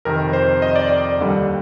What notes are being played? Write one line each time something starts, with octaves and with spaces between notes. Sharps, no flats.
F2 C3 D#3 A#4
C5
D#5
D5
D5
D#2 D3 G3